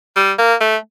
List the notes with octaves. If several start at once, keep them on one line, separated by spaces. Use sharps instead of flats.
G3
A#3
A3